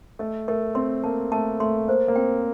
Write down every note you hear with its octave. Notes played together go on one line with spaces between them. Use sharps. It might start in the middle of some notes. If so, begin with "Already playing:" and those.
A3 D#5
A3 A#4
C4 C6
A#3 A5
A3 A5
A3 C6
A#3 C5
A#3
C4 G5